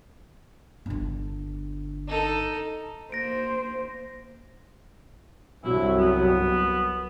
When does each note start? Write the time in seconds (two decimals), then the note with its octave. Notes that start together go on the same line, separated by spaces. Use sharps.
0.86 G1 D3
2.08 D#4 A4
3.12 A#3 C5 A#6 D7
5.64 C2 G2 F#3 E4
5.98 B3